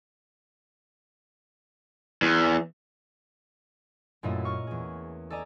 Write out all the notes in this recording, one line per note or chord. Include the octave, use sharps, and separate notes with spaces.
E2
F#2 A#2 A3 E4 D#5
A#4 C#6 F6
E2 G#4
A4 D5 D#5 G#5 A#5